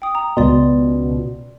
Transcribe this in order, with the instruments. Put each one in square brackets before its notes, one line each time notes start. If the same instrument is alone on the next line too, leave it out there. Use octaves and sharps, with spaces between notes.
[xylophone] G5 D#6
A#5
[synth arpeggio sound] C#2 B2 [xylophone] D5 C6